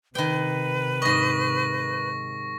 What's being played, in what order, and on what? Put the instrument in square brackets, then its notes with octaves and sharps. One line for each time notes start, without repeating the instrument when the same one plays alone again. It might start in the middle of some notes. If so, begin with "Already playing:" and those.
[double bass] C3 [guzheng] D#3 G5 [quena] B4
[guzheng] G#2 D#5 [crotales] C#6 A#6